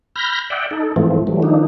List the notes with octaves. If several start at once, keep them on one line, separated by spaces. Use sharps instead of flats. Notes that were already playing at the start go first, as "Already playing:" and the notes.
B5 F6 G6 A#6
D5 E5 F#5 G5
D#4 A4
G#2 E3 F3 A3 C4
E3 F#3 G3 A3
D#3 F3 D4 D#4